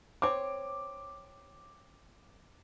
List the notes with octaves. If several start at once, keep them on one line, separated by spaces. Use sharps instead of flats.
C4 C#5 D6